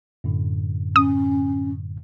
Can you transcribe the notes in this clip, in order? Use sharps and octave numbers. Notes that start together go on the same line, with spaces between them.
F#2 A2 D3
C#4 D#6